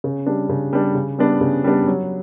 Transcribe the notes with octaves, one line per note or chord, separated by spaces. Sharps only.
C#3
G3 D4
C#3
G3 D4
C#3
G3 B3 D4
C#3
G3 B3 D4
F#3